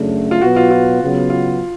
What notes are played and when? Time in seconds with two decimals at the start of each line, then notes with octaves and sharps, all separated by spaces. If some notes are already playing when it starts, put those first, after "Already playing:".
Already playing: F#2 C#3 F#3 A3 D4
0.31 F4
0.41 B2 F#3 B3 F#4
0.56 F4
0.71 F4
1.01 C#3 F#3 B3
1.30 F4